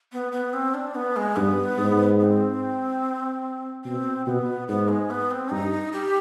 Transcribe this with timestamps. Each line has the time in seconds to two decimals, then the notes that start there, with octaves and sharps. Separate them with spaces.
0.13 B3
0.32 B3
0.53 C4
0.74 D4
0.95 B3
1.16 G#3
1.36 G2 B3
1.78 G#2
2.20 C4
3.85 B2 C4
4.26 B2 B3
4.68 G#2 B3
4.89 G#3
5.10 B3
5.31 C4
5.51 G2 D#4
5.93 G4